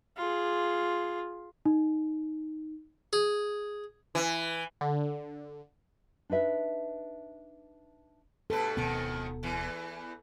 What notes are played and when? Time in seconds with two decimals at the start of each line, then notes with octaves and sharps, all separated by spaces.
0.17 F4 G#4
1.66 D#4
3.13 G#4
4.15 E3
4.81 D3
6.30 D4 D#4 B4 E5
8.50 G2 B2 A4 B4
8.77 D1 F2 G#2 B2 D#3 B3
9.43 E2 E3